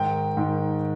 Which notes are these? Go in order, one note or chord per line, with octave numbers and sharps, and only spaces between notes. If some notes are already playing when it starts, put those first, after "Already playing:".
Already playing: G#2 D#3 G5
G#2 D#3